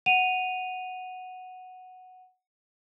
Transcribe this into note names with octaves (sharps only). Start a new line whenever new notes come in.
F#5 D#7 F7